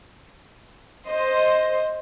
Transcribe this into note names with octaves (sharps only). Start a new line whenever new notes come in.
C5 D#5